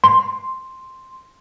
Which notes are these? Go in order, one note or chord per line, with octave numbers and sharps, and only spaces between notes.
C6